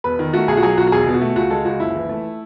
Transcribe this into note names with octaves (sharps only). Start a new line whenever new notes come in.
E1 B4
D#3
A3 F#4
B1 G#4
F#4
F#3 G#4
B1 F#4
F#4
E1 G#4
B2
F#4
A3
C#2 F#4
G#3 A4
C#2 F#4
F#1 E4
E3
A3